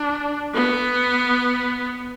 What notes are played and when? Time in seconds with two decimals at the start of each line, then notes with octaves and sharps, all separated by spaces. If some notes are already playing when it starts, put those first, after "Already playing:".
Already playing: D4
0.54 B3